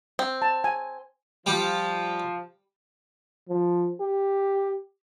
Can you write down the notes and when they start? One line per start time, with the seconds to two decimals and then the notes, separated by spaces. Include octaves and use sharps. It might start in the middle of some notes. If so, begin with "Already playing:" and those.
0.19 C4
0.42 A5
0.64 G#5
1.46 F3 G3 G4
3.49 F3
4.00 G4